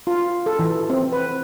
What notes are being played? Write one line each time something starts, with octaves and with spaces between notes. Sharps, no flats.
F4
A4
E3
C4
B4